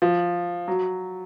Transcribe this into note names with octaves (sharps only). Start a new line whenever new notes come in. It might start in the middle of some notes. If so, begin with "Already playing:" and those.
F3
F#3